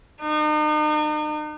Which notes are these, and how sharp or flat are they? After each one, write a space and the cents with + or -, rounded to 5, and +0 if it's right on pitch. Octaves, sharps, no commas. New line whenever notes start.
D#4 -40